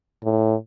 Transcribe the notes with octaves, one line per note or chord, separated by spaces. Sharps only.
A2